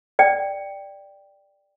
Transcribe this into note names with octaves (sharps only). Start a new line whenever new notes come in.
D5 G5